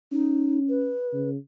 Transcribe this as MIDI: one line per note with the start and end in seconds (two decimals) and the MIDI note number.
0.12 0.93 61
0.12 0.59 63
0.69 1.30 71
1.13 1.36 49